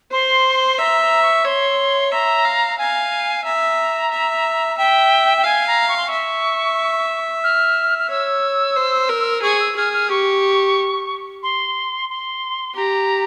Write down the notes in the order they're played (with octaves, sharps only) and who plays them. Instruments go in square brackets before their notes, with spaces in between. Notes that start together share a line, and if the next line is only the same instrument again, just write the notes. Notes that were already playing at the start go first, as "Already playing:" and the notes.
[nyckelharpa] C5 [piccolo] C6
[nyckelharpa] E5 [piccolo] A#5
[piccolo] A#5
C#6
[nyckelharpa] C#5 [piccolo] C6
[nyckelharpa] E5 [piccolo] A#5
[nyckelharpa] F5
[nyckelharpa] F5 [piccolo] G#5
[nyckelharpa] E5 [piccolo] A#5
[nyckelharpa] E5
[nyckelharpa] E5 [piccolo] G5
[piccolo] G5
[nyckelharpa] F5 [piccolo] G#5
[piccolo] A#5
C#6
C6
C#6
[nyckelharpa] E5
[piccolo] F6
F6
[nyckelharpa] C#5 [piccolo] E6
[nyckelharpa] C5
A#4
[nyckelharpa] G#4 [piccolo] C#6
[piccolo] E6
[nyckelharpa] G#4 [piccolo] F6
[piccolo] F6
[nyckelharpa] G4 [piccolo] C#6
[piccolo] C6
C6
[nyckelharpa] G4 [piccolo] A#5